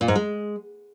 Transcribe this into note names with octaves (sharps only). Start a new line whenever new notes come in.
A#2
G#2
G#3